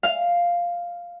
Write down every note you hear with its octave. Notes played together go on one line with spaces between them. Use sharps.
F5